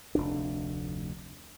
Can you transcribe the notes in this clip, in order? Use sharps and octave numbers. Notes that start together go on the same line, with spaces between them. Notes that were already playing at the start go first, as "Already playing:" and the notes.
F1 D2 D4